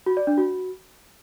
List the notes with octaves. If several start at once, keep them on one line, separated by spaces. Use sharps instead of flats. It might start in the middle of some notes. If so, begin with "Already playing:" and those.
F#4
D5
D4
F#4